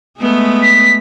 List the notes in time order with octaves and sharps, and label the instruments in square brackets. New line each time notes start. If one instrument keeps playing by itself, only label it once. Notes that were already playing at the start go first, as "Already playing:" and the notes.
[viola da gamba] G#3 A3 B3
[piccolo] B6